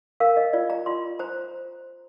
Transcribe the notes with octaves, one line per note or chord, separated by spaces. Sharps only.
A#4 F5
D#5
F4 D5
A#5
F4 C6
C5 A#5